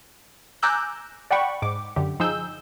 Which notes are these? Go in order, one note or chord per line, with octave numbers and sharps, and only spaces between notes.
G#5 A#5 D6 E6 F#6 G6
D5 F#5 G5 B5 C#6
G#2 D6
F#2 D3 G4
F3 D#4 G#4 E6 G6